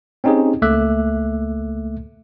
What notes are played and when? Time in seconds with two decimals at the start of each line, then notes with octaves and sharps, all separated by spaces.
0.24 C4 C#4 D#4 G4 G#4
0.62 C#2 A3 A#3 E5 D6 F#6